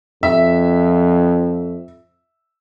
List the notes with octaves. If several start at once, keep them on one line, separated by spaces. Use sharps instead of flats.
F2 E5